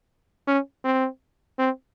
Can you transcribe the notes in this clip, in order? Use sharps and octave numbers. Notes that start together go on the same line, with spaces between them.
C#4
C4
C4